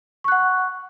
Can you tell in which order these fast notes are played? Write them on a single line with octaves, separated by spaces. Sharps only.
C#6 F#6 F#5